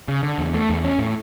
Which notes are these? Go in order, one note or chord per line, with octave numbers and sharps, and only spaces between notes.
C#3
D3
E2
A3
E2
C#4
A2